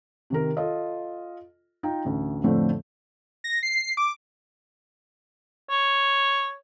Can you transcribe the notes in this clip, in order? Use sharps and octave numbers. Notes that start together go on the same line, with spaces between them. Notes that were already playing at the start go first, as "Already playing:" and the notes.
C3 D#3 A#4
F4 A4 D#5
D#4 F4 G5
A1 D2
F2 A2 D3 F3 A3 C4
A#6
C7
D6
C#5